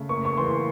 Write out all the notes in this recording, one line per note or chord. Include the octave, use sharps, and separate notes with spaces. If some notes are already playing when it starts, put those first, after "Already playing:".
Already playing: C#3 A3
A#3 C#6
C#6
E2 C6